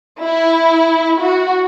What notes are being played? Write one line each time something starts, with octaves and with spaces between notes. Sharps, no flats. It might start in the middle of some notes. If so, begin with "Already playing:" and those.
E4
F#4